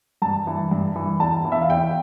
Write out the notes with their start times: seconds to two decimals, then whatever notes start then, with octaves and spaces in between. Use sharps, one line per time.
0.22 G2 A5
0.47 E3
0.71 G2
0.96 E3
1.20 E2 A5
1.45 E3
1.52 E5
1.62 F5
1.70 E2 G5